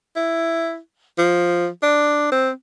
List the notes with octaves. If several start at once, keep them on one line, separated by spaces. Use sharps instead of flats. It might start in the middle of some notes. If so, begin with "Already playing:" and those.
E4
F3
D4
C4